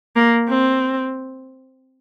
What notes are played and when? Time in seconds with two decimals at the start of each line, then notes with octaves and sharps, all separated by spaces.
0.16 A#3
0.49 C4